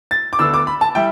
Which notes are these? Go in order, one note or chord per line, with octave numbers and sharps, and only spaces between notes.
A6
D6
D2 D3 B3 D4 E6
D6
B5
A5
G3 E4 G5